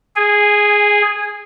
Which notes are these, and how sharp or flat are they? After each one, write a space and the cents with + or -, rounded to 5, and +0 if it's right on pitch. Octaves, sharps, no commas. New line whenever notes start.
G#4 +0 G#5 -20